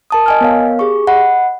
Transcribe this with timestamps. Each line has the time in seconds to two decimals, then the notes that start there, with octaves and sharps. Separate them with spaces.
0.11 A#4 A5 D#6
0.26 D#5 G#5 F6
0.41 B3 A#4 C#5 F5
0.79 G4 G#4 C#6
1.07 D#5 F#5 B5